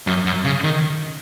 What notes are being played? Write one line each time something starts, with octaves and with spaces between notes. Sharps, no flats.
F#2
F#2
C#3
D#3